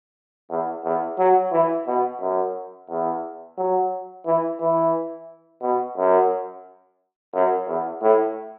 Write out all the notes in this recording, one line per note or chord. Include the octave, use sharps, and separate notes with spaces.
E2
E2
F#3
E3
B2
F#2
E2
F#3
E3
E3
B2
F#2
F#2
E2
A2